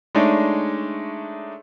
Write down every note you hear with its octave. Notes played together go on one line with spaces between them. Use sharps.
G#3 A3 D4 D#4 C#5 D5